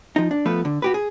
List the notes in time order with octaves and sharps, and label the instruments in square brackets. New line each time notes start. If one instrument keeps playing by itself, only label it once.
[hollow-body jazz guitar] F3 D#4
D4
F3 A3 B3 B4
D3
F#4 G4 B4
G#4